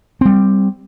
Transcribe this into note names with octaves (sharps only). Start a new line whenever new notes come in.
G3 C4